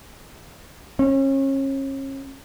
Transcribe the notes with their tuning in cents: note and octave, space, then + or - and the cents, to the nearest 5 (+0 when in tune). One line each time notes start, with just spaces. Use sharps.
C#4 -35